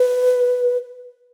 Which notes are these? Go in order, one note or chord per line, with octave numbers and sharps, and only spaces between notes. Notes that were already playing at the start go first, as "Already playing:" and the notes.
Already playing: B4